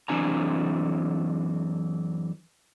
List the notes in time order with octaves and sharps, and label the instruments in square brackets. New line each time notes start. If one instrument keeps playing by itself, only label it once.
[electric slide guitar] F#2 E3 C4 D4 G#5 A#5